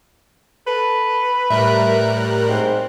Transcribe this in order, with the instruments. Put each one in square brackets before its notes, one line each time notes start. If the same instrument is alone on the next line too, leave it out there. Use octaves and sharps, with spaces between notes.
[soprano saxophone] A4 [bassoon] B4
[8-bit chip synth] A2 [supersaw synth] G3 A#4 F#6 [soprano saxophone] E5
[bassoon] G#2 [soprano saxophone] C4